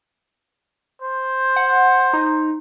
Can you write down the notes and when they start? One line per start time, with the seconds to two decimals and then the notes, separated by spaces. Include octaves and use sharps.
1.02 C5
1.56 F#5
2.13 D#4